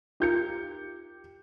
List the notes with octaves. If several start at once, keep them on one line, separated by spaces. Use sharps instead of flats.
D#4 F4 G4 A#4 G6 C#7